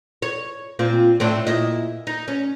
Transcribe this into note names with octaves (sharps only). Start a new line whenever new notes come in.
C#5
A#2 C4 F4
A2 C4 D4
A#2 E4 D#5
D#4
C#4